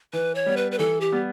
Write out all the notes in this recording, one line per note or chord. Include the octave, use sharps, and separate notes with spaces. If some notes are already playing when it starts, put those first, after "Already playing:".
E3 B4
C#5
G3 B3
B4
B4
E3 A4
G4
G3 B3